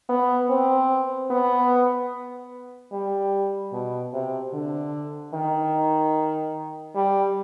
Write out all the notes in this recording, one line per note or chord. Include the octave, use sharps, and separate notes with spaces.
B3
C4
B3
G3
B2
C3
D3
D#3
G3